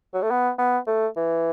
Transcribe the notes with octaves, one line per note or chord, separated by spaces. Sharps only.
F#3
A3
B3
B3
A3
E3